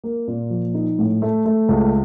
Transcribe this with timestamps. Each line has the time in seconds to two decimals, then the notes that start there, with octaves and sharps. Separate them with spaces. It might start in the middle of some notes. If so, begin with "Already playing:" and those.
0.04 A#3
0.28 A#2
0.50 F3
0.74 D#4
0.99 A2
1.22 A3
1.45 A3
1.69 C#2